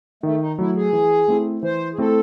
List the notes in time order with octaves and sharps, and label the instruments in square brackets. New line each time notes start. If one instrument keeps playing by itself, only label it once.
[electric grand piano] D#3 [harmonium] A3
[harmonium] D#4
[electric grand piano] F#3 A3 [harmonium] E4
[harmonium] G#4
[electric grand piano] E3
A3 C4 E4
[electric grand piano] E3 [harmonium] C5
[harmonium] G#4
[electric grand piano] A3 C4 E4 [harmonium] A4